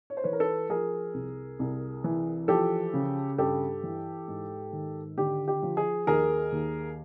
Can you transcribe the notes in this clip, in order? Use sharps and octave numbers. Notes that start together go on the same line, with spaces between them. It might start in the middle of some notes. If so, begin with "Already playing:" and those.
C#5
C5
E3 B4 C#5
A#4
A4 B4
F3 G#4 A#4
C2
C2
E3
F3 G4 A4
C#3
G2 G4 A4
E3
G#2
D#3
D3 G4
G4
F3
G#4
D#2 G#4 A#4
D#2